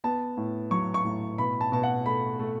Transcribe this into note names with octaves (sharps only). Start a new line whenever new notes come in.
B3 A5
A2
F#3 C#6
C#6
A2
B2 B5
A5
B2 A5
F#5
A3 B5
A3